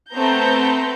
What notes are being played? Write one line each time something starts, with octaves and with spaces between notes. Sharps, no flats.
A3 B3 C4 A4 A#5 G6